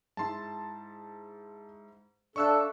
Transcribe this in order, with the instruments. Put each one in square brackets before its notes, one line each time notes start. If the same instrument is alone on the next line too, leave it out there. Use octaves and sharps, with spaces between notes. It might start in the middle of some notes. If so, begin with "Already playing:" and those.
[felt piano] G#2 E4 [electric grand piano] A5 C6
[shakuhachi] D4 [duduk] A4 [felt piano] D5 E5 F5 [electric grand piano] C#6 E6 F#6